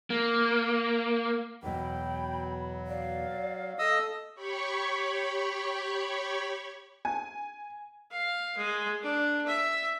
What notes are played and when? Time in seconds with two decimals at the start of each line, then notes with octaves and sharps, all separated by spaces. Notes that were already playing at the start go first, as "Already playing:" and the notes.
0.10 A#3
1.63 E2 B2 F#3 G5 B5
2.87 D5 F5
3.79 A4 D#5 D#6 E6
4.35 G4 C#5 B5 C#6
7.05 G#5
8.11 F5
8.58 G#3
9.03 D4
9.47 E5